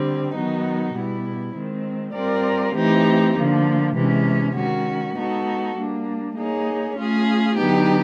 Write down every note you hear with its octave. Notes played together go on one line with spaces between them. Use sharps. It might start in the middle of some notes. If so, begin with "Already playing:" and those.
Already playing: D3 G3 C4
D#3 F#3 B3 D#4 F#4
B2 G3 B3 E4
D#3 G#3 C4
G3 C4 F4 A#4 D5
E3 A3 C4 D#4 G4
D3 F3 A#3
C3 E3 G#3 C#4
D#3 G#3 C#4 F#4
G#3 B3 D#4 F#4 A4
G3 A#3 D4
A#3 D#4 G#4 C#5
A3 C#4 F4 G#4
D3 F#3 B3 D#4 G4